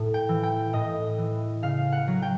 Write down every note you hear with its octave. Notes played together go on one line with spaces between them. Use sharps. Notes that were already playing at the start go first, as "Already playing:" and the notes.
Already playing: A2
G5
E3
G5
A2 D#5
E3
C#3 F5
F#5
F#3
G5